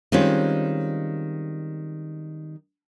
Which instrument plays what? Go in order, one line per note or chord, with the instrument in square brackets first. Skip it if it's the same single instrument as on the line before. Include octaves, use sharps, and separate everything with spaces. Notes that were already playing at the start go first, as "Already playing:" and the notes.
[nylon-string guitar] D#3 G3 G#3 C4 C#4 F4